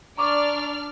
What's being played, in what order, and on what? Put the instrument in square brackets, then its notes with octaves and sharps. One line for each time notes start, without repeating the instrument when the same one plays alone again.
[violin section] D4 D5 F6 [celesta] A#5 C#6 D6